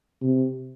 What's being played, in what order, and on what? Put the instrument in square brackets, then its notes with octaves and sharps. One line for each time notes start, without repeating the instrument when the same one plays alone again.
[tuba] C3